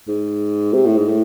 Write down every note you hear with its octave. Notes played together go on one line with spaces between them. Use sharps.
G#2
C3
A2
G#2
A2